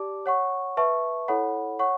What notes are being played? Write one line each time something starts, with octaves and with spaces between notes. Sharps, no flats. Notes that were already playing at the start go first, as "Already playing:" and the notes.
Already playing: G4 D5 A5 D6
C#5 F#5 C#6
B4 E5 A5 C#6
E4 A4 C#5 F#5 B5
C#5 F#5 C#6